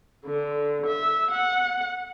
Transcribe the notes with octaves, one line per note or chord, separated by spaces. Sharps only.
D3
E5
F#5